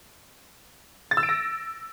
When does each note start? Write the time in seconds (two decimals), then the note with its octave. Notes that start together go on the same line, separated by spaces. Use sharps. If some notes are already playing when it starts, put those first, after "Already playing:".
1.11 A6
1.17 E6
1.23 D7
1.29 A#6